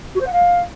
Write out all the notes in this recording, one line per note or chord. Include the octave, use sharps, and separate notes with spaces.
F#4
C5
F#5
F5